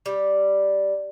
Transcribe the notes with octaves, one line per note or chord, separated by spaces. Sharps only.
G3